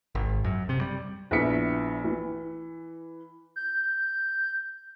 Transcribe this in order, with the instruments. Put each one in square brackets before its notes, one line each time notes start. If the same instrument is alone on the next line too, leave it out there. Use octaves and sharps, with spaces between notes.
[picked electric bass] G#1
F#2
C3
G3
[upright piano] A#1 B3 E4 E5 B6 C#7
E3
[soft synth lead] G6